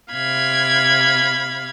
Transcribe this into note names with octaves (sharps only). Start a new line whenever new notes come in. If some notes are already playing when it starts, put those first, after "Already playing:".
C3 F5 B5 G#6